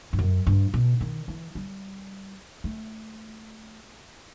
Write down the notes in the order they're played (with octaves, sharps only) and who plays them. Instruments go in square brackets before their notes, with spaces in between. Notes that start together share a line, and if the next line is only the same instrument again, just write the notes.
[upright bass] G2
F#2
G2
B2
D#3
E3
G3
A3